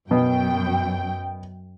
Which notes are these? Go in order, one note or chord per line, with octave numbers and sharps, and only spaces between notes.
F#2 B2 G5